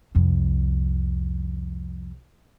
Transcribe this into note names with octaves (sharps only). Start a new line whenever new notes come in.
C2 F2